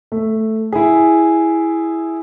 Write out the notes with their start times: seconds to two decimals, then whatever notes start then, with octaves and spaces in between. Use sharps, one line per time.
0.12 A3
0.73 E4 G#4